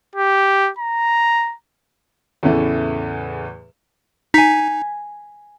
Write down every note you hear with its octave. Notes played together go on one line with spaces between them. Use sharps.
G4
A#5
E2 A2 C#3 E3 A3
D#4 G#5 B6